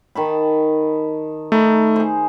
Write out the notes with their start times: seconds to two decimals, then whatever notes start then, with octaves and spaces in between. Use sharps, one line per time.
0.15 D#3 A5 B5
1.52 A3 D#4 B5
1.96 G#4 C5